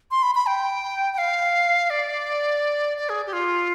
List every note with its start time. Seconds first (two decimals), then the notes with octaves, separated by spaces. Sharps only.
0.11 C6
0.23 B5
0.35 B5
0.46 G5
1.14 G5
1.18 F5
1.90 D5
2.98 D5
3.09 G#4
3.27 G4
3.33 F4